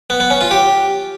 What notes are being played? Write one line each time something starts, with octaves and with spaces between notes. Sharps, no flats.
B3
B3
C#4
F4
G4